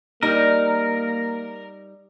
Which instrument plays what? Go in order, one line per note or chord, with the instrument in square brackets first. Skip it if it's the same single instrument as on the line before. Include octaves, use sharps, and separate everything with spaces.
[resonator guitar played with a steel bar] G3 D#4 [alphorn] A#3 [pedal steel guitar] A#4